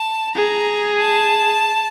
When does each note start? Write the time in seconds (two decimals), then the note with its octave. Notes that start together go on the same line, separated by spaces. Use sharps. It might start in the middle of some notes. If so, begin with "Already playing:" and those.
Already playing: A5
0.35 G#4 A#5
0.99 A5